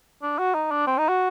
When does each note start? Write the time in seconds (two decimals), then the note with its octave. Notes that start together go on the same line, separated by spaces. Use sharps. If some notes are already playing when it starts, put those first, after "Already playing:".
0.22 D4
0.39 F#4
0.54 D#4
0.71 D4
0.87 C4
0.98 D#4
1.09 F#4